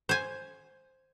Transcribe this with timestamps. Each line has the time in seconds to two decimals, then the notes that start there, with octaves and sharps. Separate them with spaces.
0.09 C5 G#5